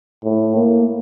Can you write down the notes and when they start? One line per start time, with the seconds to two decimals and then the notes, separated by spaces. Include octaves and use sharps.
0.24 A2
0.56 A#3